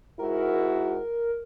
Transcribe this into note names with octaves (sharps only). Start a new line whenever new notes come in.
G#2 E4 F#4 A#4